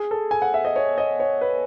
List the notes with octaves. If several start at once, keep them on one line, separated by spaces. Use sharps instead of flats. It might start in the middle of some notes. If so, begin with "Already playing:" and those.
Already playing: G#4
A4
G#5
F#5
E5
D#5
C#5
D#5
C#5
B4